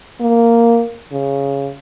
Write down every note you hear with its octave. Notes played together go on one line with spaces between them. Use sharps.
A#3
C#3